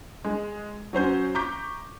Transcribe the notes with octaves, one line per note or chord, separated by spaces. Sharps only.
G#3
F#3 C#4 C5 G6
A#5 C#6 D6 G6 B6